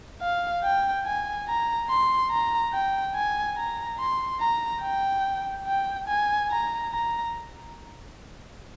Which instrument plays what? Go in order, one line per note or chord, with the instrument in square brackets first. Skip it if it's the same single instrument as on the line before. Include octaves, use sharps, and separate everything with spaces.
[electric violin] F5
G5
G#5
A#5
C6
A#5
G5
G#5
A#5
C6
A#5
G5
G5
G#5
A#5
A#5